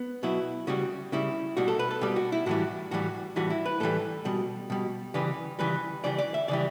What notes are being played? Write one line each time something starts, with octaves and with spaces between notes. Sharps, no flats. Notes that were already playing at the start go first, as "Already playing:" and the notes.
Already playing: B3
B2 F#3 E4
C#3 G3 F#4
C#3 G3 E4
B2 G3 F#4
A4
B4
A4
B2 G3 G4
F#4
E4
A2 E3 G3 F#4
A2 E3 G3 F#4
A2 E3 G3 F#4
E4
B4
A2 E3 G3 A4
B2 G3
B2 G3
C#3 E3 G3 B4
C#3 E3 G3 B4
C#3 E3 G3 D5
D5
E5
C#3 E3 G3 D5